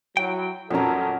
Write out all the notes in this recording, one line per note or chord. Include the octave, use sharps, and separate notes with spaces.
F#3 E4 G5
F2 A#2 F#3 C#4 A4 A#5